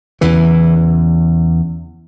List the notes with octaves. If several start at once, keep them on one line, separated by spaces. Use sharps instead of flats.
E2 C#3 E3